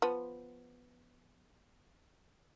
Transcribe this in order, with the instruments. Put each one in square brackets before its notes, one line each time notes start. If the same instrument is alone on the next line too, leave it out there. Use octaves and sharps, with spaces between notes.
[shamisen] F3 B3